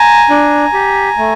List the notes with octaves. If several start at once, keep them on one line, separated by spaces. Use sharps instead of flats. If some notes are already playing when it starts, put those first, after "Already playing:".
Already playing: G#5 A#5
D4
G4
A3